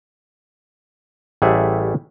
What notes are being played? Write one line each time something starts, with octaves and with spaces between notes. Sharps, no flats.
A1 G3 A3 G#4 E5 F#5